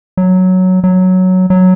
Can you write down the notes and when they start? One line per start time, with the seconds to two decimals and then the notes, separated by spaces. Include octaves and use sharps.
0.17 F#3
0.84 F#3
1.50 F#3